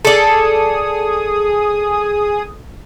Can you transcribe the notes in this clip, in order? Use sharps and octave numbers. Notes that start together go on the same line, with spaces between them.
G#4 A4 D5 D#6